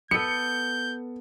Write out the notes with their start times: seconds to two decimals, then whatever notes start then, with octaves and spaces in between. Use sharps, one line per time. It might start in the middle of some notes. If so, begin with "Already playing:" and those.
0.11 B3 A4 G6 C#7